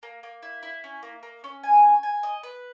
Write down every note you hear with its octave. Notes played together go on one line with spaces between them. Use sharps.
A#3
A#3
E4
E4
C#4
A#3
A#3
C#4
G#5
G#5
G#5
D#5
B4